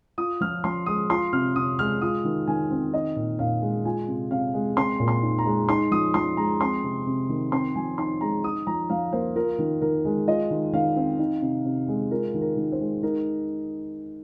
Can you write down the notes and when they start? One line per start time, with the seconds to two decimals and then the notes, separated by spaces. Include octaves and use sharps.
0.18 F4 D#6
0.41 F3 F6
0.64 F3 C6
0.86 G#3 D#6
1.10 F4 C6
1.33 C3 F6
1.56 C3 D#6
1.79 G#3 F6
2.01 F4 D#6
2.25 D#3
2.47 D#3 G#5
2.71 C4
2.93 D#4 D#5
3.16 A#2
3.39 A#2 F5
3.62 G#3
3.85 F4 G#5
4.08 C3
4.31 C3 F5
4.54 G#3
4.77 C4 C6
5.00 A#2
5.08 C6
5.22 D#4
5.38 A#5
5.46 G#3
5.69 D#4 C6
5.91 F3 D#6
6.14 F3 C6
6.37 G#3 A#5
6.61 C4 C6
6.83 C3
7.06 C3
7.29 D#3
7.52 C4 C6
7.75 F3 G#5
7.98 D#4 C6
8.21 G#3 A#5
8.44 D#4 D#6
8.67 F3 A#5
8.89 F3 F5
9.12 A#3 C5
9.36 F4 A#4
9.59 D#3
9.81 D#3 A#4
10.05 G#3
10.28 F4 D#5
10.51 D#3
10.73 D#3 F5
10.96 C4
11.19 D#4
11.42 C3
11.65 C3
11.88 G#3
12.11 F4 A#4
12.34 D#3
12.41 A#4
12.57 D#3
12.72 C5
12.80 G#3
13.03 D#4 A#4